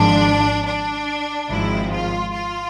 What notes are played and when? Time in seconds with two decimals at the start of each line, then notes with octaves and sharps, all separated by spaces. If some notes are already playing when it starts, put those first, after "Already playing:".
Already playing: G#1 G#2 F3 D4
0.66 D4
1.49 G#1 G#2 F3 E4
1.92 F4
2.33 F4